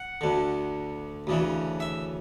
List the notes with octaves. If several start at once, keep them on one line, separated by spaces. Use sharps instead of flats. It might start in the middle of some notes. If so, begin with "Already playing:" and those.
Already playing: F#5
D2 D3
D2 C#3 E3
E5